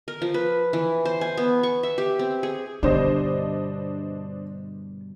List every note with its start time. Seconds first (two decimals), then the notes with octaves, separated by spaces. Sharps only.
0.08 A#4
0.22 F3
0.34 B4
0.73 E3
1.05 C5
1.21 G#5
1.37 B3
1.63 C#6
1.83 E5
1.98 G4
2.19 C4
2.43 G#4
2.83 G2 B2 D3 D4 C5 D#5